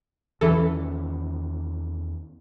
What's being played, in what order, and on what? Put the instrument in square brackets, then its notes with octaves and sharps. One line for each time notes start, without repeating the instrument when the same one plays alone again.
[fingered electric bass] E2 D#3 C#4 [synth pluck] E3 A4